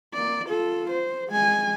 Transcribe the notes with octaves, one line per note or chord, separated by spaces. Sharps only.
A#3 D5
F4 A4
C5
G#3 G#5